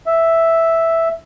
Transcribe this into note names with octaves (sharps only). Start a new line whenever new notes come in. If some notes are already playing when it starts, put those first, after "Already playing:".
E5